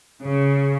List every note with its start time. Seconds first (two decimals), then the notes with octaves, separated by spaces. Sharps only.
0.24 C#3